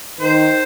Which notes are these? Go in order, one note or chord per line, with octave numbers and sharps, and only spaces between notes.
D#3 C5